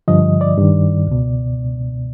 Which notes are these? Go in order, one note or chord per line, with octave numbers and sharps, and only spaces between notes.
G2 D3 F3 D#5
D5
G2 D#3
C#2 B2